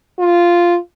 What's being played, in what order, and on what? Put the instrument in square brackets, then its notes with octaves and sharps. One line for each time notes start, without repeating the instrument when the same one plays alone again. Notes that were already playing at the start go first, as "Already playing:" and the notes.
[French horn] F4